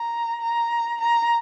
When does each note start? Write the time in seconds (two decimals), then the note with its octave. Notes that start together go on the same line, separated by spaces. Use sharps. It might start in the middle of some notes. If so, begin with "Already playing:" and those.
Already playing: A#5
0.42 A#5
1.01 A#5